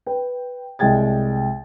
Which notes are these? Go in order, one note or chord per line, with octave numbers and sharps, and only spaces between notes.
B4 G5
C2 G#3 G5 G#6 A6